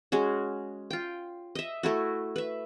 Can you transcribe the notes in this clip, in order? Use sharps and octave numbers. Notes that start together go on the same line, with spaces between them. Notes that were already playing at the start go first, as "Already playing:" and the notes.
G#3 C#4 F#4
F4 G5
D#5 E5
A3 E4 F#4
B4 E5